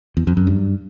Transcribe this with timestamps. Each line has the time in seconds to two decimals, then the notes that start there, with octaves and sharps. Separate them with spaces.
0.17 E2
0.27 F2
0.37 F#2
0.47 G2